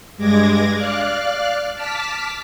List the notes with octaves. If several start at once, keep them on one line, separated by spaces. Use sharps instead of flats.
G2 G#3 D6 G#6 A#6
D5 F5 F6 F#6
A5 D6 F6 B6